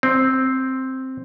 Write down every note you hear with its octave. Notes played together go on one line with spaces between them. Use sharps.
C4